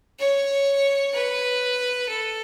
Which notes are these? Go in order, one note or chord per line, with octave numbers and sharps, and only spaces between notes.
C#5
B4
A4